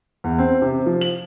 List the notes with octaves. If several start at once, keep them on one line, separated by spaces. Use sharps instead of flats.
E2
C4
C3
F3
F#7